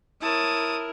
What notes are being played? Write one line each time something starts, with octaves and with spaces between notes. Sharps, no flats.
E4 A#4 C#5 A5 D#6